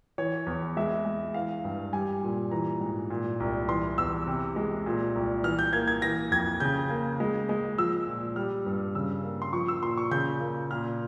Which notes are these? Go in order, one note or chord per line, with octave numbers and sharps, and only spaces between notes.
E3 C#5
E2
G#3 E5
G#3
E3 F5
G2
G3 G#5
A#2
E3 A#5
G#2
A#2
C2
E3 C6
E2 E6
C3
G#3
A#2
C2
E3 F6
G6
A#3 G#6
G#6
E3 A#6
F2 G#6
C#3 G6
A#3
G#3
G#3
F3 E6
A#2
G3 F6
G2
C#3 E6
A#3
C6
F3 C#6
E6
A#2 C6
C#6
C#3 G6
A#3
A#2 F6